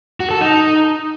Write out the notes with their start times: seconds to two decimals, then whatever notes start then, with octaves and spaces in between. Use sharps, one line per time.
0.20 F#4
0.31 A4
0.41 D#4